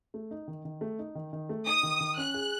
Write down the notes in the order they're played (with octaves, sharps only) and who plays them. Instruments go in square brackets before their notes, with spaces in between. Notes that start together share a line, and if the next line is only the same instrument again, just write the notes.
[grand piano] A3
D#4
D#3
D#3
A3
D#4
D#3
D#3
A3
[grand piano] D#4 [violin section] D#6
[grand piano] D#3
D#3
[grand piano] C#4 [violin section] F#6
[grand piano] G#4